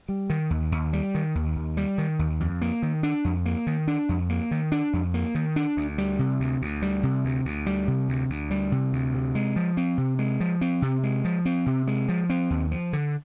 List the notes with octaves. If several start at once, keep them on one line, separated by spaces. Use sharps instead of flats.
G3
D#3
D#2
D#2
G3
D#3
D#2
D#2
G3
D#3
D#2
F2
A#3
D#3
D4
F2
A#3
D#3
D4
F2
A#3
D#3
D4
F2
A#3
D#3
D4
D2
G3
C3
D2
D2
G3
C3
D2
D2
G3
C3
D2
D2
G3
C3
D2
C3
G#3
F3
C4
C3
G#3
F3
C4
C3
G#3
F3
C4
C3
G#3
F3
C4
D#2
F3
D3